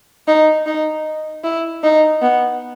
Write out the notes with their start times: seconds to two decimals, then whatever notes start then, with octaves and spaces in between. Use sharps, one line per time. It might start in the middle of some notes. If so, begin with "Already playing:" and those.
0.28 D#4
0.66 D#4
1.44 E4
1.84 D#4
2.22 B3